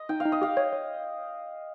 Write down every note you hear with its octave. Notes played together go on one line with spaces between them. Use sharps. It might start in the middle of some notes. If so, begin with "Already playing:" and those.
Already playing: D#5
D#4 G5
F5
D#4
D#5
G4 F5
C#5
C#5